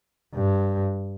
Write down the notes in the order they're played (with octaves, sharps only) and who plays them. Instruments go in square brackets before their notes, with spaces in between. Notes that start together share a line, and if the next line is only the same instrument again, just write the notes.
[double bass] G2